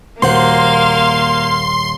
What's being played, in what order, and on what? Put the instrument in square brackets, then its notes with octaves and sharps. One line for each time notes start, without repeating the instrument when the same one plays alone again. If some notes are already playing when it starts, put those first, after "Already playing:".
[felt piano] D#1 [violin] A#3 F5 [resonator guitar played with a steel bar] F#4 C5 F#5 [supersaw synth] C6